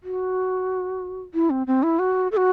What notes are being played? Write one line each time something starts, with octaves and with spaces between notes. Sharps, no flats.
F#4
E4
C4
C4
E4
F#4
A4
F#4